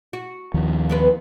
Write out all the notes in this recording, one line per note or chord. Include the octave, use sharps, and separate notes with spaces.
F#4
D#2 D#3 F3
B3 C4 B4